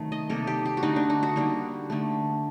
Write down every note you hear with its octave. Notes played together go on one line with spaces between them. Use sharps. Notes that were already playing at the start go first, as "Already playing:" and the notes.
Already playing: C3 D#3 F#3 A3
D#5
C3 G3 A#3 A4
G4
G4
F#4
D3 A3 D#4
D4
D#4
F#4
D3 G3 A#3
D3 A3